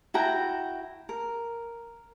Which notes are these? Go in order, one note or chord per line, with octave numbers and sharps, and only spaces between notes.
E4 F#4 G5 A#5
A#4